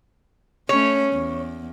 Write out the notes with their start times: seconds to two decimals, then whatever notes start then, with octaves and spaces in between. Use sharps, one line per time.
0.69 A3 C#4 C#5
1.13 E2